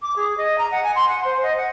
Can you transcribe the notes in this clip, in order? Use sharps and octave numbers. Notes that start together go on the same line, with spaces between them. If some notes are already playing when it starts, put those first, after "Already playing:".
D6
G#4
D#5
A#5
F#5
G#5
C6
F#5
C5
D#5
F#5